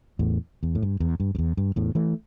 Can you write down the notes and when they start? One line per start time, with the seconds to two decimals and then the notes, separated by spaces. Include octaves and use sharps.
0.19 E2 A2
0.63 E2
0.75 A2
0.82 G2
1.00 E2
1.20 G2
1.35 G2
1.38 E2
1.57 G2
1.76 E2 A2
1.95 E3 A3